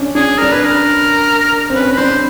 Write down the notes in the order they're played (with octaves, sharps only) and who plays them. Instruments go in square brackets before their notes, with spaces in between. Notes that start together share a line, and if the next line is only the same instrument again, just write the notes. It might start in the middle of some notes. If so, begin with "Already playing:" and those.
Already playing: [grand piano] C#4 D4
[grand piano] D4 [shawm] G#4
[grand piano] D4 [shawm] A#4
[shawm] B4
A#4
[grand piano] C4
[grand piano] C#4 [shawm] B4
[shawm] B4
[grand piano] D4 [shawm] C5